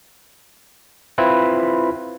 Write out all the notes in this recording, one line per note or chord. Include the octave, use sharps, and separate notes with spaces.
C4 E4 F4 B4